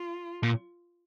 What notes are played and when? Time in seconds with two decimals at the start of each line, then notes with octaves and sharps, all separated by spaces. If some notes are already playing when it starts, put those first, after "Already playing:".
Already playing: F4
0.43 A#2